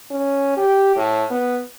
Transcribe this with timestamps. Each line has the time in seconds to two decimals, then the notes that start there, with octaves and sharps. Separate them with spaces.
0.11 C#4
0.57 G4
0.97 A2
1.31 B3